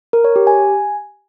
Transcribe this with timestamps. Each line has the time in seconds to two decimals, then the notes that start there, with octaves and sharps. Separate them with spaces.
0.13 A#4
0.24 C#5
0.36 G4
0.47 G#5